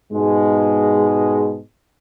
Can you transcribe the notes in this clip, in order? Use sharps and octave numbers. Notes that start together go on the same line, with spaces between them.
G#2 B2 G#3